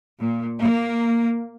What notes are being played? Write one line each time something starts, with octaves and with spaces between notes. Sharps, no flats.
A#2
A#3